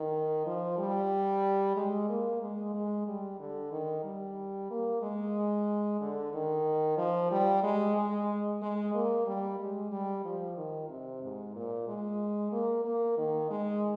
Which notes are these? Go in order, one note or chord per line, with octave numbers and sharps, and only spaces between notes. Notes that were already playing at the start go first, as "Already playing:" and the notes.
Already playing: D#3
F3
G3
G#3
A#3
G#3
G#3
G3
D3
D#3
G3
A#3
G#3
D3
D#3
F3
G3
G#3
G#3
G#3
A#3
G3
G#3
G3
F3
D#3
C3
G#2
A#2
G#3
A#3
A#3
D#3
G#3